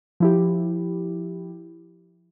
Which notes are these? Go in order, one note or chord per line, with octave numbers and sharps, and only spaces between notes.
F3 E4 G4